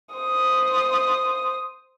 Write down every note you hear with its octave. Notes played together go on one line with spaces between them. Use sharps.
C5 D#6